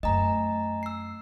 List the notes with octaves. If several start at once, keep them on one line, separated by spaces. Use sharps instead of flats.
F#2 A3 D#5 G#5 A#5
E6 C7